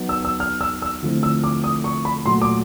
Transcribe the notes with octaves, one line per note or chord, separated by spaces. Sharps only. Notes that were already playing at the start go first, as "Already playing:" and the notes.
Already playing: F#3 B3 D#4
E6
E6
F6
E6
E6
D3 F3 A3 C4 E4
E6
D6
D#6
C#6
B5
A#2 F#3 A3 C6
D6